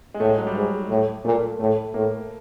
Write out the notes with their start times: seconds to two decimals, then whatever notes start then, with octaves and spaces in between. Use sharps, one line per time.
0.14 G#3
0.20 A2 A3
0.29 G#3
0.38 F#3
0.47 G3
0.55 G#2 G#3
0.89 A2
1.24 A#2 A3
1.59 A2 A3
1.94 A2 A#3